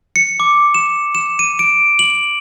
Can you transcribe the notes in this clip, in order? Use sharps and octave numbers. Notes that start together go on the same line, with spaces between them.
C#7
D6
E7
E7
D#7
D7
F#7